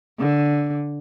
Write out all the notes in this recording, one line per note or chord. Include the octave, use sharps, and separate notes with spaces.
D3